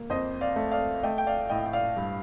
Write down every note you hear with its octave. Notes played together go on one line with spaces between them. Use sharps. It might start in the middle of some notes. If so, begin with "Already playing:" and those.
Already playing: A#3
F2 C5 D#5
D5 F5
A3
D5 F5
A3 D#5 G5
G5
D5 F5
A2 D#5 G5
G5
D5 F5
G2